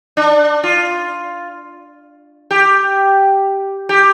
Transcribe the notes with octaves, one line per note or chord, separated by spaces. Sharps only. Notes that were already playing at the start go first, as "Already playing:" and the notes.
D4
F4
G4
G4